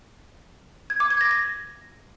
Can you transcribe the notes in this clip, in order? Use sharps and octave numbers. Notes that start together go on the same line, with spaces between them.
G#6
D6
G#6
A#6
A#6